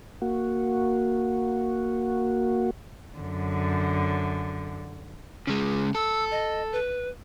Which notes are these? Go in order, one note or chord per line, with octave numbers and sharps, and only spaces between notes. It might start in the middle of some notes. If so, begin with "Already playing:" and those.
A#3 F#4
F#2 D3
C#3 G#3
A4 E6
D#5
B4